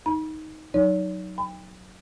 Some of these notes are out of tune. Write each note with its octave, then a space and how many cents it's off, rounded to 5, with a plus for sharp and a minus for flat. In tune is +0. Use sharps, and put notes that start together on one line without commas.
D#4 +10 B5 -40
F#3 +0 D#4 +0 C#5 +45
G5 +30 B5 +25